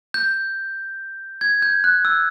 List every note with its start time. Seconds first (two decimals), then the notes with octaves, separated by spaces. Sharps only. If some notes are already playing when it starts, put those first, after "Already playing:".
0.14 G6
1.41 G#6
1.62 G6
1.84 F#6
2.05 E6